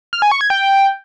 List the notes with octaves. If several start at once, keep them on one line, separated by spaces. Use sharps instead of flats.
F6
G#5
C#6
G#6
G5